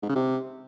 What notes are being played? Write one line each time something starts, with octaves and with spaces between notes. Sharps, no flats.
G#2
C#3
C3